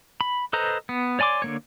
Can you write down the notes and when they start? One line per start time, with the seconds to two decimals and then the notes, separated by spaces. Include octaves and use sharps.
0.21 B5
0.53 A4 B4 C5 D#5 A#5
0.89 B3
1.19 C#5 D5 G#5 C6 D6
1.42 D3 A#3 C#5